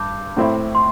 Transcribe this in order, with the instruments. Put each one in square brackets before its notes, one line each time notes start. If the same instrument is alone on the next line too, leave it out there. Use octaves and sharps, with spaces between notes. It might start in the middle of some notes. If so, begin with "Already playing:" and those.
Already playing: [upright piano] G2 [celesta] D6 G6
[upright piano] A2 A3 C4 E4
[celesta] C6